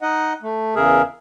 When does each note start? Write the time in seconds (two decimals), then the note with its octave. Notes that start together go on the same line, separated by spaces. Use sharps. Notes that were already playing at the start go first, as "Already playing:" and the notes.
0.02 D#4 D#5 F#5
0.42 A3
0.76 E2 C#3 G#4 A#4 E5